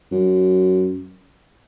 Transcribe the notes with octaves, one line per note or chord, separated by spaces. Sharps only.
F#2